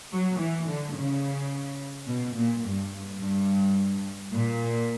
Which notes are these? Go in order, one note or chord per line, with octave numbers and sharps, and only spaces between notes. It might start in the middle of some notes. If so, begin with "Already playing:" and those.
F#3
E3
D3
C#3
B2
A#2
G2
G2
A#2